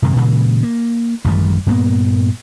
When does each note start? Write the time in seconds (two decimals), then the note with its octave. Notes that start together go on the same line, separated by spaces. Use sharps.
0.02 F#2 C3 D#3 G#3
0.16 A#2 C#3 E3 G#3
0.63 A#3
1.25 A1 F#2 D#3 G3
1.66 G2 A#2 A#3 B3